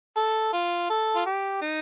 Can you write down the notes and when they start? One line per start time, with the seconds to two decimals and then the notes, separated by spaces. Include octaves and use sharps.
0.16 A4
0.53 F4
0.90 A4
1.15 F4
1.26 G4
1.62 D#4